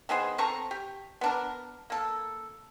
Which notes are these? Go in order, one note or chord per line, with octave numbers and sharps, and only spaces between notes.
D#3 B3 G#4 C5
C4 A4 A#5 C#6
G4
B3 D4 A#4
A#3 A4